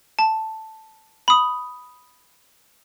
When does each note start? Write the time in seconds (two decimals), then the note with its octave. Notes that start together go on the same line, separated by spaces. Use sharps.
0.19 A5
1.28 B5 D#6